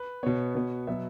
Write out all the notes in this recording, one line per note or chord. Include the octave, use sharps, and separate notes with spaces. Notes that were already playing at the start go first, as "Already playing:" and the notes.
Already playing: B4
B2 B3 C#5
B2 B3
B2 F#3 B3 E5